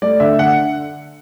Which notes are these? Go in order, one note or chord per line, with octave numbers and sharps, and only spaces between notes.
A3 D5
D3 E5
D3 F#5